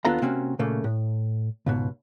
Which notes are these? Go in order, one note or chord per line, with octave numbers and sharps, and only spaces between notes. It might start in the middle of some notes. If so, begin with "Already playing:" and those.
D#2 B3 D4 F4 A4 A#5
C3 A#3 C4 C#4 F#4
A#2 C#3 A3 A#3
A2
C#2 G#2 B2